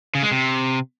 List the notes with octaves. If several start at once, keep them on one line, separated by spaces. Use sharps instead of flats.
C#3
G#3
C3